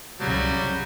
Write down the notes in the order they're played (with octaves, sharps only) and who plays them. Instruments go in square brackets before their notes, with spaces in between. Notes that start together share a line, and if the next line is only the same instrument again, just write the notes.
[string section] C2 F#2 C#3 [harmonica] F#3 G3